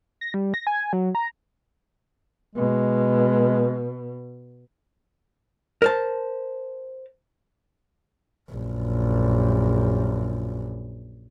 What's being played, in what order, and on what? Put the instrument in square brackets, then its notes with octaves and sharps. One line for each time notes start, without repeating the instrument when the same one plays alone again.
[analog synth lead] A#6
G3
A#6
G#5
F#3
A#5
[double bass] B2 [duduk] G#3
[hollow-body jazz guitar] A#4 C5 A5
[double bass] A#1 F#2